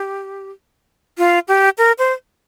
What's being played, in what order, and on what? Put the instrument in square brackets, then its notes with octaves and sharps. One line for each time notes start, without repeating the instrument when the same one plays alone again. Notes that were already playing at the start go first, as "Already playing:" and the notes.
Already playing: [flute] G4
F4
G4
A#4
C5